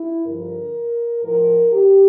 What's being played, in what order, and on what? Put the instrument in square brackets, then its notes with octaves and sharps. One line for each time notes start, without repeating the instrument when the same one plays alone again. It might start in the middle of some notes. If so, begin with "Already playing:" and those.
Already playing: [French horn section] E4
G2 D3 F3 A#4
A2 F3 A#4
G4